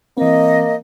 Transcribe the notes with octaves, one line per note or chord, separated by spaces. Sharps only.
E3 A#3 C4 D#5